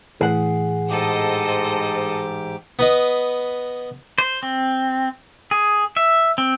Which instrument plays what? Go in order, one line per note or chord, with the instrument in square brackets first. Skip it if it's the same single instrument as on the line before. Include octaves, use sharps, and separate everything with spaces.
[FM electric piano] A2 E3 [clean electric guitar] G#4 F#5
[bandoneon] G#2 G4 D6 [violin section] A4 C5 D#5
[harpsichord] B3 B4 D#5
[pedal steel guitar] C5
C4
G#4
E5
C4